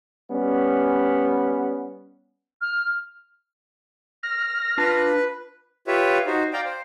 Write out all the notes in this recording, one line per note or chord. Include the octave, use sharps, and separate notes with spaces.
G3 B3 C#4
F6
F6 A#6
D4 F4 B4 A5
F4 G4 B4 C#5 E5
D#4 F#4 C5
D5 F5 G5 A#5
C5